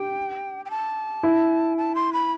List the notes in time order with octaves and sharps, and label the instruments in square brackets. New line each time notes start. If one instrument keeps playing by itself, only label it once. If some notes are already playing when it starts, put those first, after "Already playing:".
Already playing: [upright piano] G4 [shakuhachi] G5
[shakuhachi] G5
A5
[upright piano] E4
[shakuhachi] A5
C6
B5